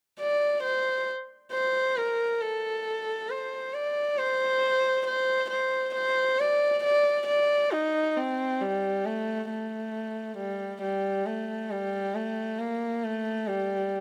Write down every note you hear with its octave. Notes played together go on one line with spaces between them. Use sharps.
D5
C5
C5
A#4
A4
C5
D5
C5
C5
C5
C5
D5
D5
D5
D#4
C4
G3
A3
A3
G3
G3
A3
G3
A3
A#3
A3
G3